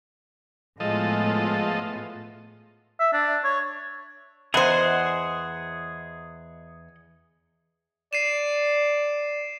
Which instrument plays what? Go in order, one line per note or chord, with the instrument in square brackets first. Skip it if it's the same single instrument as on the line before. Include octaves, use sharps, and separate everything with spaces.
[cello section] A2 B3 F4 [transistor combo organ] F3 A4 D#5 [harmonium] G#3
[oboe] E5
D4
C#5
[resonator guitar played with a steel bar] E2 C5 [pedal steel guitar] G#4 D#5 F#5
[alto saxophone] D5 [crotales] C7 D#7 E7